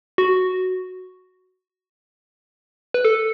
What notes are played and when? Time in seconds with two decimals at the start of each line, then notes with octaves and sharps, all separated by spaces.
0.18 F#4
2.94 B4
3.05 A4